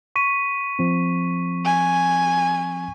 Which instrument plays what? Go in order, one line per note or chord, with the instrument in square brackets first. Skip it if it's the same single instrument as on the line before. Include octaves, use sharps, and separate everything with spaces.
[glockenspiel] C#6 B6 D#7
[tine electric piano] F3 C4
[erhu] G#5